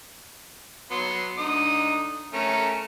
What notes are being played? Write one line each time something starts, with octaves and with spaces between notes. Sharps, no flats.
F#3 B3 C6
D3 D#4 D#6
A3 C#4 A#4